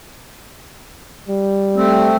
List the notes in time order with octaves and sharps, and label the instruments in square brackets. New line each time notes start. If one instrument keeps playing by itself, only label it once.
[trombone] G3
[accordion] A3 C4